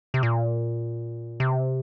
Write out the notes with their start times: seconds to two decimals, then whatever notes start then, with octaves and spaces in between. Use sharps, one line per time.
0.14 C3
0.23 A#2
1.40 C3